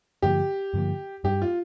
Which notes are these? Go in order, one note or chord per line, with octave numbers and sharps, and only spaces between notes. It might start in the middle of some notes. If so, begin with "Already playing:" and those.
G2 D3 F3 A#3 G4
G2 D3 F3 A#3
G2 G3 D4 G4
F4